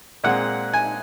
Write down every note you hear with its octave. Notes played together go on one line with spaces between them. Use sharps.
A#2 G#3 C4 F#5
G#5